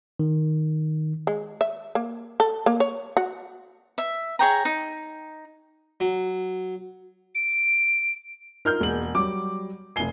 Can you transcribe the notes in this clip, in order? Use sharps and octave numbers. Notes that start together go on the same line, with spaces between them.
D#3
G#3
E5
A#3
A4
A#3
C#5
F#4
E5
G#4 C#5 G5 A#5
D#4
F#3
D7
D#4 F4 A#4 F6 G6
E1 G#3 A#3 F#7
F#3 G3 D6
F1 G#5 C7 G7